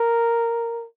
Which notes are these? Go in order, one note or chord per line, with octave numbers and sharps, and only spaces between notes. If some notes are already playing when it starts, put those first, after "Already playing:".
Already playing: A#4